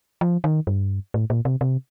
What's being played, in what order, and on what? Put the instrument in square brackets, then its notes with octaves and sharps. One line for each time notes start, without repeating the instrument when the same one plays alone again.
[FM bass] F3
D#3
G2
A2
A#2
C3
C3